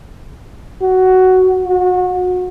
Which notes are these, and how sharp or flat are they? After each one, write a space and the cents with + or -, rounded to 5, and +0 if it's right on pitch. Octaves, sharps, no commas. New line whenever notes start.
F#4 +10
F#4 -30